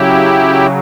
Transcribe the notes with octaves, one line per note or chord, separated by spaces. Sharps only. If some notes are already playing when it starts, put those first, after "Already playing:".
Already playing: C#3 F#3 E4 G4